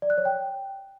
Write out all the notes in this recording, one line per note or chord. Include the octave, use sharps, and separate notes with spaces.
D5
F#6
C#5
G5